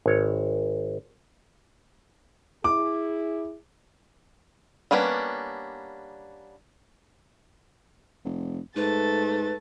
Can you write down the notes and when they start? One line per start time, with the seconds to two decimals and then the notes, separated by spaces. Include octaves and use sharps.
0.06 G#1 C#5
2.64 E4 G#4 D6
4.91 G3 A#3 B3 C#4 D4
8.25 F1
8.76 G#2 A3 B4 A6